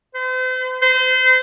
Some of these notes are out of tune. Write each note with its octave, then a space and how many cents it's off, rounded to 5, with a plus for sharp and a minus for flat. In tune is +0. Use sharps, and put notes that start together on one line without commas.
C5 -40
C5 -30